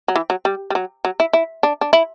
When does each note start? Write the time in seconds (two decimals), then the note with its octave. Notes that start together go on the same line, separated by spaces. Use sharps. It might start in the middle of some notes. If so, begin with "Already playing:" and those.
0.08 F#3
0.16 E3
0.30 F#3
0.45 G3
0.70 G3
0.75 F#3
1.05 F#3
1.20 E4
1.33 E4
1.63 D4
1.81 D4
1.93 E4